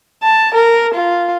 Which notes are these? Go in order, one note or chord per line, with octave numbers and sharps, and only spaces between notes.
A5
A#4
F4